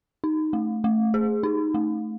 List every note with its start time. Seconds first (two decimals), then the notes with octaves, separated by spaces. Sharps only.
0.24 D#4
0.53 A3
0.84 A3
1.14 G#4
1.43 D#4
1.74 A3